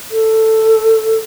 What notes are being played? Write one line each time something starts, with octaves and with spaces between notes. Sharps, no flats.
A4